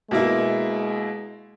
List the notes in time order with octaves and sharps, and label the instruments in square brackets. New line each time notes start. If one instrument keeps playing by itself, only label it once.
[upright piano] B2 A#3 E4 [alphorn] G#3